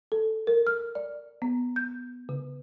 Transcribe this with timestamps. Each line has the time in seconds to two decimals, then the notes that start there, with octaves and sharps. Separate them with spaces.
0.12 A4
0.47 A#4
0.67 F6
0.95 D5
1.42 B3
1.76 G6
2.29 C#3